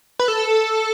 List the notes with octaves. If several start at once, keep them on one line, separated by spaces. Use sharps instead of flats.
B4
A4